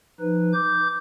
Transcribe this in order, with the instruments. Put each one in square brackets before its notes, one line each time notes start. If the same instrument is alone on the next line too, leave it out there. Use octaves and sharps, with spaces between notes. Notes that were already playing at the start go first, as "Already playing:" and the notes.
[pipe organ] F3 D#4 B4
D6 G6